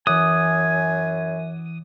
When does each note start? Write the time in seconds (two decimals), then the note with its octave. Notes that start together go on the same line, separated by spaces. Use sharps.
0.07 F#2 E3 G#5 D6 D#6 F#6